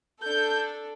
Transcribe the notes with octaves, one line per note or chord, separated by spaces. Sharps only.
D4 A4 G6